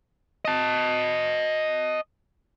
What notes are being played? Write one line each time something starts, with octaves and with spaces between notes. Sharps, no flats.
D#5 A5